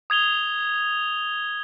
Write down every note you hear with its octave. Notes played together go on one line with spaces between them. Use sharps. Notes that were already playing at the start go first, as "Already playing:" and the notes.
D#6 G#6 F7 G7